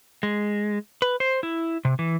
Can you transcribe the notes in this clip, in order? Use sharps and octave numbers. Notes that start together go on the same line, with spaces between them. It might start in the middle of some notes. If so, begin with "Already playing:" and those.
G#3
B4
C5
E4
C3
E3